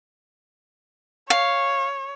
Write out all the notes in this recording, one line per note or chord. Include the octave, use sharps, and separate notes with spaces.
C#5 F5